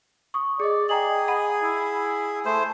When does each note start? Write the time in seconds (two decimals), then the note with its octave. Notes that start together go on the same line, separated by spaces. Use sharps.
0.34 C#6 D#6
0.60 G#4 D5 D#5
0.89 G#4 D#5 G5 A#5 F#7
1.28 F#5 B5 D#7
1.63 E4
2.45 A3 C5